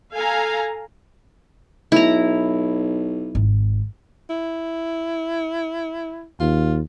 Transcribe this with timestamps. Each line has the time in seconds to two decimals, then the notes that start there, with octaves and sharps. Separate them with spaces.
0.15 A4 F5 G#5 A#5
1.92 B1 E4 A#5
3.35 G#1
4.30 E4
6.40 D#2 F4